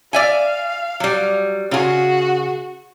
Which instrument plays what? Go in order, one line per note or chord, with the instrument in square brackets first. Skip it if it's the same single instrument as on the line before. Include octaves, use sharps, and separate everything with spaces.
[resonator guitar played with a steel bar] D5 E5 G#5 [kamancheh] F5
[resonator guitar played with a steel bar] F#3 G3
[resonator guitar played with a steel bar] C#3 G#4 [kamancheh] F#4